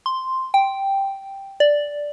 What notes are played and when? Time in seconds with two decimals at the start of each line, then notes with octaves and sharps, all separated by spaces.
0.06 C6
0.54 G5
1.60 D5